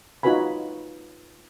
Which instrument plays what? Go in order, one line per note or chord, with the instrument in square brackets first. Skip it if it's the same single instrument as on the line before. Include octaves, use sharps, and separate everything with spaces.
[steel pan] D#4 F4 F#4 B4 G#5 B5